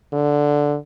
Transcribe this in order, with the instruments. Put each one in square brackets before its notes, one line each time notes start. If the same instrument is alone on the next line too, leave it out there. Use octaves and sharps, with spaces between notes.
[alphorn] D3